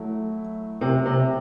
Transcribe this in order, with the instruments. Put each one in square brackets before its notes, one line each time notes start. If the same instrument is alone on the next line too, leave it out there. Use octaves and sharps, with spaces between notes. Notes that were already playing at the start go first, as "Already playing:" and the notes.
Already playing: [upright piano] F#3 A3 E4
[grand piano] C3
C3